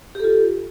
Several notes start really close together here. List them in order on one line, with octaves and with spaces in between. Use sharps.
G4 A4 F4